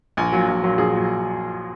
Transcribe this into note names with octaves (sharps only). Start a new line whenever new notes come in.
A#1 G#5
A#2 F#3
A#1
A#2 F#3
A#1 G#4
A#2 F#3